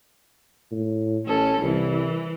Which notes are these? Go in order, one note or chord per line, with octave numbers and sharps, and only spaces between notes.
A2
A1 C#4 A4
C2 E3